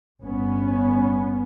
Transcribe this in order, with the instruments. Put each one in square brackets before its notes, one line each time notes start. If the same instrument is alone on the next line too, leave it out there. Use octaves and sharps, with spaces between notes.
[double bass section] G1 B3 C#4